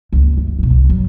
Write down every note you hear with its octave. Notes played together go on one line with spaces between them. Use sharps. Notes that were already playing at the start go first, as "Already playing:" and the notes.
F#1 C#2
D2 G2
B2 E3
C2
G2 F#3